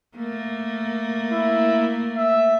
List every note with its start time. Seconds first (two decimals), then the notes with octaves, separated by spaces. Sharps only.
0.17 A3 A#3
1.32 E4
2.17 E5